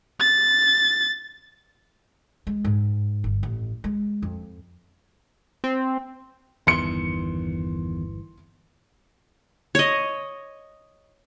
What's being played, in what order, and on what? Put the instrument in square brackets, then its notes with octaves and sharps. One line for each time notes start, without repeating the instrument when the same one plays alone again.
[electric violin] A6
[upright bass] G#3
G#2
G1
A1
G#3
F2
[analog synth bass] C4
[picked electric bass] G1 E3 [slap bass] E2 D#3 [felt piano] C6 C#7
[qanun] C#5 D#5